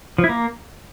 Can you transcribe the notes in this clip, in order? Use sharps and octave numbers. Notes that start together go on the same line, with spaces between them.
F3
E4
A#3